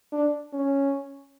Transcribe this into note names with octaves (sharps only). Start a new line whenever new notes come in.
D4
C#4